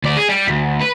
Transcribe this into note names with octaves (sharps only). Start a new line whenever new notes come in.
D2 D5
G#4
G3
D2
B4